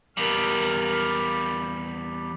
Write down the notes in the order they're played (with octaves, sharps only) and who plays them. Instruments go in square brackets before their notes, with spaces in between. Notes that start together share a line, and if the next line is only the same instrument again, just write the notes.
[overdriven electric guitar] E2 G3 [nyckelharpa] A#4 F5